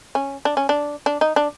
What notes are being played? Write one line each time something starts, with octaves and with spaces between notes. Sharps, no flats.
C#4
D4
C#4
D4
D4
D#4
D4